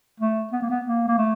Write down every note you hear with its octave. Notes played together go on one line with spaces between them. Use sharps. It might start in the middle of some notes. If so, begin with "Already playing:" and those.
A3
B3
A#3
B3
A#3
A#3
A3